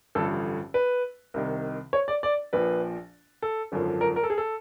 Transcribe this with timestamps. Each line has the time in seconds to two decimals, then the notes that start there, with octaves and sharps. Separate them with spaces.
0.15 A1 G2 D3 F3 A4
0.74 B4
1.34 C2 C3 D#3
1.93 C#5
2.08 D5
2.23 D5
2.53 A#1 A#2 F3 B4
3.42 A4
3.72 G#1 F#2 D3 F3
4.01 A#4
4.16 A#4
4.23 A4
4.30 G#4
4.38 A4